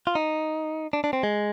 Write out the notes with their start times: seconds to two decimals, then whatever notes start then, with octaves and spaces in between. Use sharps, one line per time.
0.07 F4
0.15 D#4
0.93 D4
1.04 D4
1.13 C4
1.23 G#3